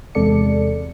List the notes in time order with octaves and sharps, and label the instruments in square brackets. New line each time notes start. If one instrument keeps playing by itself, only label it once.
[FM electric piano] E2 C3 G#3 A4 D5 C#7